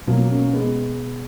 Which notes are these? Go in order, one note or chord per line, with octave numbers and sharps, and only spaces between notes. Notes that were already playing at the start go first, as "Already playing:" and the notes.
B2 F#3 A#3
A#3 C#4
G#3 B3